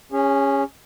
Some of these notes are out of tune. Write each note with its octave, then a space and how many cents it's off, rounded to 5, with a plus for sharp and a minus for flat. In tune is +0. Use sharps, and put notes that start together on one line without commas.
C#4 +0 G#4 -35